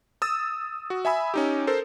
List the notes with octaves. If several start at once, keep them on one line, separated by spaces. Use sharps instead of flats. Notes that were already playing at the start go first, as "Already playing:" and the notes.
D#6 E6 A6
F#4
E5 G#5 B5 E6
C#4 D#4 G4
A4 A#4 C5